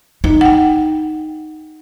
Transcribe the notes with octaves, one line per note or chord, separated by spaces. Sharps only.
D#4
F#5 G5